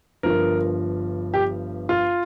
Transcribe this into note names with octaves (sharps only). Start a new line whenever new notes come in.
G1 G2 F3 A#4
G4
F4